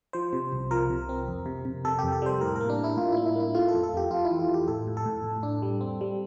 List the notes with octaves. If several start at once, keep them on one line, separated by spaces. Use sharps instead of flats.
F3 C5
C3
C2
F3 A#4
C3
C4
F2
C3
C3
C3 A4
F2 G4
A4
G3 C5
A2 A#4
A#3 A#4
D4
A2 E4
A2 F4
E4
A#3
E4
A#3 E4
A3 F4
A4
F2
A4
F2 G4
F2 F4
E4
E3
F4
F2
G4
A2 A4
A2
A4
A2
A2
D4
G3
C4
G3